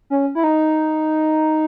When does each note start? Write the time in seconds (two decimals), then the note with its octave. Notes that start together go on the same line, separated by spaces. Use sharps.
0.10 C#4
0.35 E4
0.44 D#4